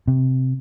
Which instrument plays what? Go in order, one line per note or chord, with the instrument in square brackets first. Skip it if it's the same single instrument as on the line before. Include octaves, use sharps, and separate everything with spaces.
[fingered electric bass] C3